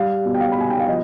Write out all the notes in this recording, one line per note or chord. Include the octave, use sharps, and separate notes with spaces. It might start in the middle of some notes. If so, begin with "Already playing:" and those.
Already playing: G3 F5
B2
G5
F5
B5
B2 G#5
G5
F5
F3 D#5